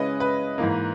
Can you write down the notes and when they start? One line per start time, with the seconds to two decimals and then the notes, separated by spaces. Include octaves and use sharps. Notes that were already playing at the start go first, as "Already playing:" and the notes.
Already playing: C#3 G#3 C#4 E4 B4 D#5
0.20 B4
0.58 G#2 E3 A#3